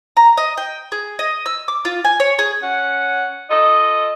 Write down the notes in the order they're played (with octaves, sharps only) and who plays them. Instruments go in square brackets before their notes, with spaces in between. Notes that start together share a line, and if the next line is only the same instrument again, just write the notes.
[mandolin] A#5
D#5
G5
G#4
D#5
E6
D6
F4
G#5
C#5
G#4
[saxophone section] C#4 F#5
F4 A4 D#5